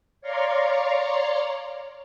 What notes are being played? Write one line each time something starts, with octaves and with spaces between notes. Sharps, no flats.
C#5 D5 F5 A#5 C6 C#6